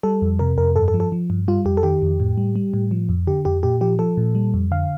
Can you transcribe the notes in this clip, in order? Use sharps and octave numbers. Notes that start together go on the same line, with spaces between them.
G3 A4
F2
C3 A#4
F2 A#4
G2 A4
A4
F3
A4
F3
G2
G3 F4
F2 G4
A4
D#3 G4
F2
A2
G3
G3
A2
F3
F2
D3 G4
F2 G4
A#2 G4
F3 G4
F3 A4
A#2
G3
F2
D3 F5